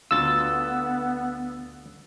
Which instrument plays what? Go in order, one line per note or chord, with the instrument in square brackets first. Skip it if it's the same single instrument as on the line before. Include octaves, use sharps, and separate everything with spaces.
[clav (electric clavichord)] D2 D3 F4 [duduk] B3 [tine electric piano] E6 A6